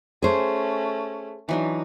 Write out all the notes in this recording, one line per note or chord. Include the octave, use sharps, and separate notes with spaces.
A3 C#4 G#4 C5
E3 F#3 D4 D#4